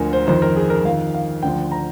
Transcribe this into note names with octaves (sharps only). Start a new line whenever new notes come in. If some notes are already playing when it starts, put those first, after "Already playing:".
Already playing: D2 D3 F3 A#4 G#5
C5
F2 D#3 C5
A#4
G#4
A#4
F2 D#3 F5
F5
D2 D3 F3 G5
A#5